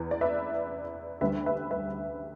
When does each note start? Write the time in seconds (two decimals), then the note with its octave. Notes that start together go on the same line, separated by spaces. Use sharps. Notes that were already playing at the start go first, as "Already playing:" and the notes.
Already playing: E2 E3
0.11 D5
0.21 B4 E5
1.21 D2 D3 G3 B4 E5
1.46 B4 E5
1.71 B4 E5